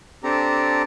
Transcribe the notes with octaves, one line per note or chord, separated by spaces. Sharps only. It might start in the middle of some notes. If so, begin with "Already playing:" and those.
C4 D4 G4 A4 A#5